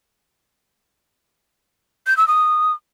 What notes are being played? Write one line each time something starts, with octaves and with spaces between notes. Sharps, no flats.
G6
E6
D#6